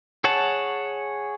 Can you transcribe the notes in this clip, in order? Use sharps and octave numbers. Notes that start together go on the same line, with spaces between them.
G#4 C#5 F#5 A5